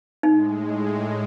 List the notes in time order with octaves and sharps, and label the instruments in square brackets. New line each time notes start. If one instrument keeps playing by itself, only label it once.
[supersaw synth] A2 G#3 [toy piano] D#4